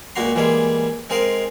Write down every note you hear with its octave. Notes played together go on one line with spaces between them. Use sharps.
C#2 A#2 A#3 F#4 A#5 C6
E3 G3 G#3 A#3 G#4
G#3 C4 A#4 D#5 F5